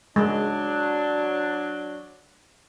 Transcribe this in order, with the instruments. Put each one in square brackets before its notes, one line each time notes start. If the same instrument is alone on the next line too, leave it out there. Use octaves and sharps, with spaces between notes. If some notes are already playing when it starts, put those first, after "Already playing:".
[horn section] F#3 D4 [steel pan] G#3